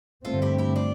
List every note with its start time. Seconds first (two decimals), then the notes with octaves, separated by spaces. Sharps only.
0.25 G2 D3 A3 C4 F4 A4
0.42 E4 G4
0.58 E4 G4
0.76 D4 F4